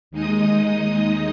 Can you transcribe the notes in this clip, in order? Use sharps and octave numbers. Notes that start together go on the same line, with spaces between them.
D#2 G#3 D#4 D#5 D#6